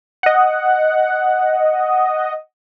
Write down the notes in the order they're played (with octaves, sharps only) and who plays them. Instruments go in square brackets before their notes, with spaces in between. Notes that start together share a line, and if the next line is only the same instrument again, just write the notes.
[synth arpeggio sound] D#5 F#5